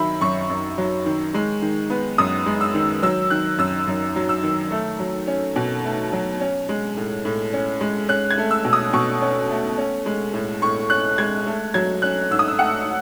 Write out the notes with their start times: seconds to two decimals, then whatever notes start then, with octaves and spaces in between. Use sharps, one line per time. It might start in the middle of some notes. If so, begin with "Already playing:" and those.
Already playing: D#3 F#3 E5 B5
0.21 F#2 C#6
0.50 F#2
0.78 F#3
1.06 D#3
1.34 G#3
1.62 D#3
1.90 B3
2.18 F#2 D#6
2.46 G#3
2.61 E6
2.74 D#3
3.03 F#3 E6
3.30 D#3 F#6
3.58 F#2 E6
3.87 F#2
4.16 F#3
4.29 E6
4.43 D#3
4.71 A3
5.00 F#3
5.27 C#4
5.56 B2
5.84 A3
6.13 F#3
6.41 C#4
6.69 G#3
6.97 A2
7.25 A2
7.53 C#4
7.81 G#3
8.08 C#4 F#6
8.31 G#6
8.38 A3
8.51 E6
8.65 B2
8.73 D#6
8.93 B2 C#6
9.22 C#4
9.49 A3
9.78 C#4
10.06 G#3
10.33 A2
10.62 A2 C#6
10.90 C#4 F#6
11.18 G#3 G#6
11.46 A3
11.74 F#3 G#6
12.02 C#4 F#6
12.31 G#2 E6
12.39 D#6
12.48 E6
12.59 A3 F#5